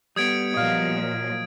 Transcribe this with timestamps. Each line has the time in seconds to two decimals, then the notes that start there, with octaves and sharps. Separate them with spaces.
0.16 G3 B3 D#6 G#6 D7
0.54 A#2 F3 F#3 D#5 F5